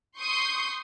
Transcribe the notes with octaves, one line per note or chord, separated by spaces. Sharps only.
C6 C#6 D#6 G6 C7